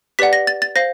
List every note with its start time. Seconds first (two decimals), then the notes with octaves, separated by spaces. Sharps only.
0.19 G4 B4 D5 F#5 B6
0.33 A#6
0.47 A6
0.62 A6
0.76 C5 F5 A#6